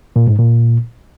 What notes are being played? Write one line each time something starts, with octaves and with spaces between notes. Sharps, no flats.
A#2
G#2
A#2